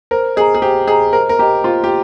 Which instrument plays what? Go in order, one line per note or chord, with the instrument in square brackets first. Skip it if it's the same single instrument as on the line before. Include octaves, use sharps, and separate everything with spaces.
[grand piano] A#4 [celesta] C5
[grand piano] G#4 [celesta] D#5 A#5
[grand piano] G#4
[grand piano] G4 [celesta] C5
[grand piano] G#4 [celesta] D#5 A#5
[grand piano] A#4 [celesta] C5
[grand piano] A#4
[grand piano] G4 [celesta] D#5 A#5
[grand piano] F4 [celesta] C5
[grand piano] G4